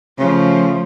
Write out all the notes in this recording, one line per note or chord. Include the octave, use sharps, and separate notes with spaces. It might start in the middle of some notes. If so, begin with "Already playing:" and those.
C#3 F3 A3